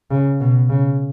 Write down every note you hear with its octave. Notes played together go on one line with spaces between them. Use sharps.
C#3
B2
C#3